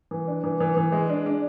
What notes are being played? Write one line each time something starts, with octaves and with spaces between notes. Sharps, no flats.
E3
D4
E3
E3
E3
G#3
D4
D4